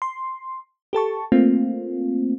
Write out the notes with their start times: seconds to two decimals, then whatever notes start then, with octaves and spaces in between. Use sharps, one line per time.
0.02 C6
0.93 G4 A4 A5 C#6
1.32 A3 A#3 C4 F4